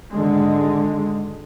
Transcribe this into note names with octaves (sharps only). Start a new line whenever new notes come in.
G#1 D3 G#3